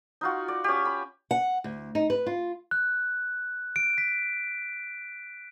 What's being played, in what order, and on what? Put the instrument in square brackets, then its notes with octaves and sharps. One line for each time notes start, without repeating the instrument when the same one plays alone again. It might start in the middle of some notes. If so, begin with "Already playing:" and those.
[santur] D#4 F4 F#4
D5
C#4 G4
B5
[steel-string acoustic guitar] F#5
[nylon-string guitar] D2
D#4
B4
F4
[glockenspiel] F#6
D7
B6